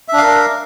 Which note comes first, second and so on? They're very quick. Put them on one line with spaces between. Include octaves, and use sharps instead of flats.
E5 D4 F5 A#4